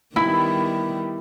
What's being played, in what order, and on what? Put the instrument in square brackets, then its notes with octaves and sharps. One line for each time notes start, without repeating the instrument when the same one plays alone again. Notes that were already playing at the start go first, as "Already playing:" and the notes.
[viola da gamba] D#3 G3 B3 [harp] E4 [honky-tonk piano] B5